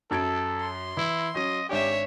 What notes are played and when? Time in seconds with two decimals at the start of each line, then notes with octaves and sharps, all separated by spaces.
0.11 F#2 A4 G#6 D7
0.60 C6
0.97 E3 E4
1.35 F#3 C#4 D#5
1.69 G#1 D4 G4 C#5 E5 G#5